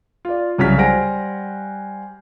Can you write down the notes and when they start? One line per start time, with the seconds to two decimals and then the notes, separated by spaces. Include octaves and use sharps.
0.25 F4 D5
0.58 C2 C#3 F#3 F6 B6
0.78 G3 C5 F#5 G#5 A#6 D7